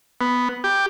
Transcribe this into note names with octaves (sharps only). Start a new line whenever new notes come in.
B3
G4